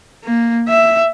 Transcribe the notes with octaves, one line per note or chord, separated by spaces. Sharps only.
A#3
E5